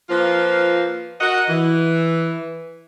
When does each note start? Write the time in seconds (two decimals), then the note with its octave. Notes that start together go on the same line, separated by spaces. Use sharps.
0.10 F3 A#3 F4 B4 C5
1.20 F#4 A#4 D#5 F#5
1.49 E3